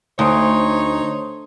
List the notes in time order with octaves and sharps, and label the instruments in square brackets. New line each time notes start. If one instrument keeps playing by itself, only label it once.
[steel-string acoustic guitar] D2 [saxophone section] D#4 C#5 [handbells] C5 C6 D#6